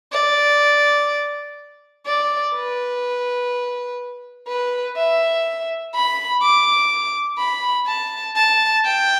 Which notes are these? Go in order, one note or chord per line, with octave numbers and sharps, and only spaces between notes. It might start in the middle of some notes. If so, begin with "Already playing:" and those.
D5
D5
B4
B4
E5
B5
D6
B5
A5
A5
G5